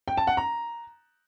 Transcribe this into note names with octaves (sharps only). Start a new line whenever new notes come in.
G5
A5
F#5
A#5